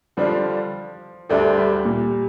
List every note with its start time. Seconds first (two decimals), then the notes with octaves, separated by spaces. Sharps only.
0.17 D3 F3 G3 D4 F4
1.30 D2 D3 G3 A3 D4
1.58 G3
1.85 A#2